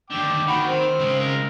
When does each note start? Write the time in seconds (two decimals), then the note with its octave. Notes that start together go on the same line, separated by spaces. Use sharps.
0.10 D#2 D3 G5 D6
0.48 D#3 F#4 B5
0.66 C4
0.99 C#3 G#3
1.19 A#4